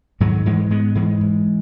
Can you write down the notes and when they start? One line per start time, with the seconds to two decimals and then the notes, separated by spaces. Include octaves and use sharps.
0.20 G#2 D#3 F#3
0.46 G#2 E3 G#3
0.70 G#2 G#3 B3
0.95 G#2 E3 G#3
1.21 G#2